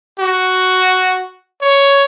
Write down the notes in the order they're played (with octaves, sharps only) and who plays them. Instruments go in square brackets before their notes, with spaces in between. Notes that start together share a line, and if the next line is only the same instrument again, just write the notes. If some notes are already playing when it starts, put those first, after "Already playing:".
[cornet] F#4
C#5